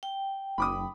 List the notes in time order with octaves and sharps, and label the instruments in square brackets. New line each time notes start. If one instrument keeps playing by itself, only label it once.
[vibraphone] G5
[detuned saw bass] F#1 [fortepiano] B5 D6 D#6